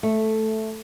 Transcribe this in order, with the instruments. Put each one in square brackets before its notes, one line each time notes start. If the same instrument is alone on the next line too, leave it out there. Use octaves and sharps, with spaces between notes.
[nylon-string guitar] A3